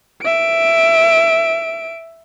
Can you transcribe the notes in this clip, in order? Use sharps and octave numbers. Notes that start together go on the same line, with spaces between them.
E5 D7